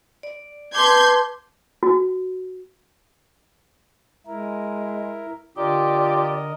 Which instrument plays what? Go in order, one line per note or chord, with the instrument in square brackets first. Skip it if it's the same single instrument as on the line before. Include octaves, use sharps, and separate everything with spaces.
[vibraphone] D5
[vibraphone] B4 A5 D6 [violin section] C6 G6 G#6
[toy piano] F#4
[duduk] G#3 [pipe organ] E4 A#4
[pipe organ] D3 A#4 D#5 [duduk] F4 [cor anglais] G4 [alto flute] D5